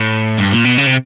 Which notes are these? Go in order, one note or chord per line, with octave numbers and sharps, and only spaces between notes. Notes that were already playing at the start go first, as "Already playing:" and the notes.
Already playing: A2
G2
A#2
B2
C#3
C3